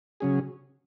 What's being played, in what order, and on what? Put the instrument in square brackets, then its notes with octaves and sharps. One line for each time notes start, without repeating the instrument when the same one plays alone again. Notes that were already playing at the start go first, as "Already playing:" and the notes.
[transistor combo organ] C#3 F#3 C#4 G#4